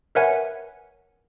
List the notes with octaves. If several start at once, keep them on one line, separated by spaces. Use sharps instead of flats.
A#4 B4 C#5 E5 F#5 G#5